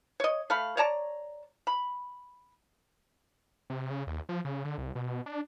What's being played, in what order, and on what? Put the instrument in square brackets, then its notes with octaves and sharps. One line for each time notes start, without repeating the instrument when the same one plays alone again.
[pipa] C#5 D#5
A3 F5 B5
C#5 D5 A5 A#5
B5
[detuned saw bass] C3
C#3
D#2
F3
C#3
D3
C2
B2
D4